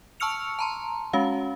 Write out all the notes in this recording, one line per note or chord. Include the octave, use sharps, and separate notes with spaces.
A5 C#6 E6 F6 C#7 F7
A5 A#5 C6
G#3 C#4 F#4 F5